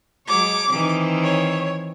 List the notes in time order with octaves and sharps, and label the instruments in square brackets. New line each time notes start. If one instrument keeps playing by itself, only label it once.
[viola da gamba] F#3 G#3 C#5 [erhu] D6
[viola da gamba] D#3 E3 C4
[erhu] C#5